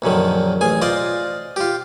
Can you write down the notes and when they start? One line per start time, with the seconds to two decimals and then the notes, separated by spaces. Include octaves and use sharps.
0.02 A#1 F#2 D3 D#3
0.61 A1 G#4 G#5
0.82 F4 C5 D5 D#5
1.56 F4 G4